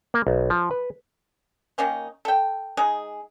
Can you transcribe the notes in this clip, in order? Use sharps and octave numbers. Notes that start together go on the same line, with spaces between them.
A#3
B1
F3
B4
D#3 A#3 C#4 D#4
A4 G5
G#3 D#4 G#4